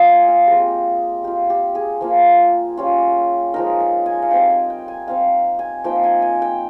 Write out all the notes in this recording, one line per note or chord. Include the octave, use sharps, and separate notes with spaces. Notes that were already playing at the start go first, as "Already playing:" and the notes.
Already playing: A#3 F4 D#5
G#5
F5
G#3 C4 F4 G4
A#3 F4 G4
G4
G#4
F3 A#3 F4
G3 C#4 F4
F3 G#3 D#4 A#4
A#4
G#5
F5
G3 C4 D#4 G5
G#5
G5
G#5
G3 C4 F4 F5
G#5
F3 A#3 D#4 G5
G#5
G#5
G5